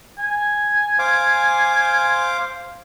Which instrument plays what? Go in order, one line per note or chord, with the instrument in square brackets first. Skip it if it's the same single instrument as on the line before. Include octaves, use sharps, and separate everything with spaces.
[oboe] G#5
[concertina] C5 F5 D6